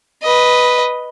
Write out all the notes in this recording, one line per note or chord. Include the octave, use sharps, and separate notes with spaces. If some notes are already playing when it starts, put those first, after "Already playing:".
B4 D#5